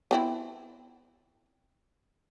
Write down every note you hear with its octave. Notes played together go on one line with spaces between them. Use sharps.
B3 C4 E4